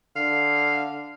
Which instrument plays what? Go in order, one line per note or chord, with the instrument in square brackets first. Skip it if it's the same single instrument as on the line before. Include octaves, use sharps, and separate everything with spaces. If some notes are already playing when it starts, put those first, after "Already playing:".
[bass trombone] D3 [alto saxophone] F5